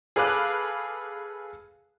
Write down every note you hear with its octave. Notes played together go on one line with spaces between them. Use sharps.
G#4 A4 B4 F5 D6 F#6